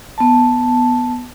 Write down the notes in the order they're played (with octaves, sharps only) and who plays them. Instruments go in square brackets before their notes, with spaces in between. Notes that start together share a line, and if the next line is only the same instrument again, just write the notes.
[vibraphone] B3 A5